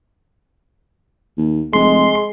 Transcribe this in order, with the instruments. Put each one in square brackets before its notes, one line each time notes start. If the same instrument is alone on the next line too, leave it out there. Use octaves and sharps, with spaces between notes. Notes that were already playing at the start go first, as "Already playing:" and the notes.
[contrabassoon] D#2
[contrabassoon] F1 [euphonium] G#3 [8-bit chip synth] C6